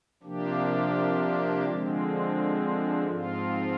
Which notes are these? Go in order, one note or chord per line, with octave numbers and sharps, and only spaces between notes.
C3 F3 A#3 D4 G4
D3 F3 G#3 C4
G#2 F3 C4 F4